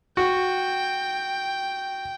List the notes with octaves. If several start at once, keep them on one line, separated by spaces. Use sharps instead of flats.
F#4 G5